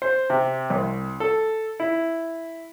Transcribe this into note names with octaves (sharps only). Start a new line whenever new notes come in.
C5
C3
C2
A4
E4